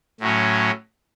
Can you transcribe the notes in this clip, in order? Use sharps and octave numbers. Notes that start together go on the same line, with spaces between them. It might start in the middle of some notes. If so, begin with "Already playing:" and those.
A2 F#3 C#4